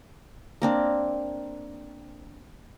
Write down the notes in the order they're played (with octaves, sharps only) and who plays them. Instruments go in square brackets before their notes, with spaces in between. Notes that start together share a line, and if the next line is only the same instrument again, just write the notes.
[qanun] A#3 C4 D4